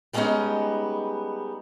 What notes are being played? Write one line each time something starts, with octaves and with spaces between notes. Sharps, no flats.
G3 G#3 A#3 B3 C#4 D#4